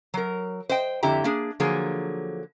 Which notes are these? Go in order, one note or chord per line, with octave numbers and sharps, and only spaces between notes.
F#3 A#4
C5 D#5 G5
F2 D3 E4 G4 A#5
A#3 D4 G#4
D3 F3 F#3 A#3 G#4